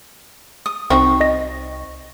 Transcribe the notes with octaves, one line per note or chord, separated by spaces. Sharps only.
D#6
C2 C4 D#4 F#4 C#6
D#5 A#6